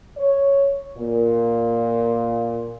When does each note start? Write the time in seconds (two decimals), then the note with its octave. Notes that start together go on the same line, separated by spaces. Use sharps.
0.17 C#5
0.98 A#2